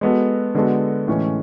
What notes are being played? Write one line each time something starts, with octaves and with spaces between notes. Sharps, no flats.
G#3 B3 F#4 A4
D3 G#3 B3 F#4 A4
A2 E3 G#3 C#4